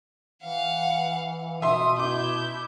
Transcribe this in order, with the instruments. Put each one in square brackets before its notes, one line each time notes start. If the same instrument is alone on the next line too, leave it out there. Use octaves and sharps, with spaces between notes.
[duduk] E3 [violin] F5 F#5
[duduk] B2 [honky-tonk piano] E5 C6 [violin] D#6
[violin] E4 G6 [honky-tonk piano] D6